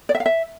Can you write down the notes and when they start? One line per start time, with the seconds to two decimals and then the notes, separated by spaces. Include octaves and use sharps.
0.09 D5
0.15 E5
0.20 F5
0.26 E5